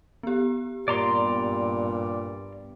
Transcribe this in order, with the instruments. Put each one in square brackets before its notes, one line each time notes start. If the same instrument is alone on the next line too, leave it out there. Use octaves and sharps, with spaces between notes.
[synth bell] B3 G4
[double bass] G2 [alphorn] A#2 [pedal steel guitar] D5 A#5 C6